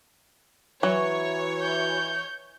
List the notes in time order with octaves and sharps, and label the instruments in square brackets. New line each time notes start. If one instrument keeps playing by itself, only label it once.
[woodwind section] E3 [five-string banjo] F#3 [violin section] C#5
[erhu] G6